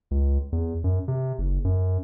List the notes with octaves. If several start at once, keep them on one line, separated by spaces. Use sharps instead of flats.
C#2
E2
F#2
C3
F#1
F#2